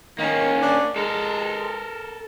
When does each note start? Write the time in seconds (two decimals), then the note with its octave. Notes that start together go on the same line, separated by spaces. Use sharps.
0.19 D#3 A#3 C#4
0.62 D4
0.96 G#3 A4 A#4